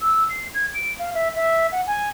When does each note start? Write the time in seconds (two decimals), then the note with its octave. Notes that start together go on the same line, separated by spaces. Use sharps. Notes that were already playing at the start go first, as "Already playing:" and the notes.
0.01 E6
0.30 C7
0.55 G#6
0.74 D7
0.99 F5
1.14 E5
1.35 E5
1.72 F#5
1.87 G#5